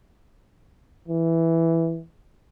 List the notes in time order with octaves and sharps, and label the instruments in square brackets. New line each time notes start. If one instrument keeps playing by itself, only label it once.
[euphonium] E3